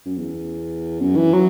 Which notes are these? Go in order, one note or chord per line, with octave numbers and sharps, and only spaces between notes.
F#2
E2
F#2
E3
F#3